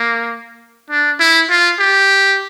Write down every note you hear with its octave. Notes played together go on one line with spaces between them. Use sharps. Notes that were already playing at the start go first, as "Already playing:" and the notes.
Already playing: A#3
D4
E4
F4
G4